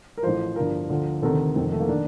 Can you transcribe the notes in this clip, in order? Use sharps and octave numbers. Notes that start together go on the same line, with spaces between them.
A#4
A1 A2 F3 C5
G1 G2 F3 A#4
D2 D3 F3
D2 C3 D#3 A4
F1 F2 D#3 C4
A3
A#3
D#3 D4